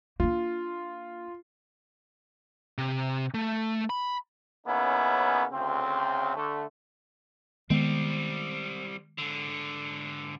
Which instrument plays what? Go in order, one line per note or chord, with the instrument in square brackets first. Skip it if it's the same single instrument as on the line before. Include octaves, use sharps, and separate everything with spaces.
[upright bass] A#3 D4 [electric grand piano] F4
[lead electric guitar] C3
A3
B5
[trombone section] C#3 A#3 B3 C#4 D#4 E4
D2 C#3 C4
D3 A3
[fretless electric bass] D#3 G#3 B3 [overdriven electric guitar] G3 C4
[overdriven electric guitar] G#2 D3